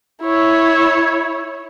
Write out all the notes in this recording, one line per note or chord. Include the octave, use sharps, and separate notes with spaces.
E4 C#5